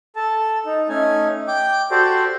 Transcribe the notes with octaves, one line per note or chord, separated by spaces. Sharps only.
A4 A5
D#4
A3 C#4 D#4 G#5
G5 D6
F#4 G4 A4 C5 D5